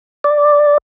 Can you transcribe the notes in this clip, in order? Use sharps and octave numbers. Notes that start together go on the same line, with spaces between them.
D5